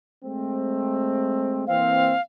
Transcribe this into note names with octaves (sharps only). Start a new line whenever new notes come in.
G#3 A3 C4
E3 A#3 C4 F5